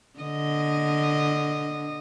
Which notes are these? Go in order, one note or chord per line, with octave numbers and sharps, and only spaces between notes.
D3 D#5